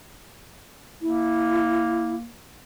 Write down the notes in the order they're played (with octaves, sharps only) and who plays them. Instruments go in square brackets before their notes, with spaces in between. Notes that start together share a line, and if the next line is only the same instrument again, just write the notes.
[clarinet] A#3 [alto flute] E4